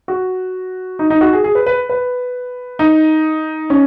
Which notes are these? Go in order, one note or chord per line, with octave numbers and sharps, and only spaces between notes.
F#4
D#4
D#4
F#4
G#4
G#4
B4
B4
B4
D#4
C#4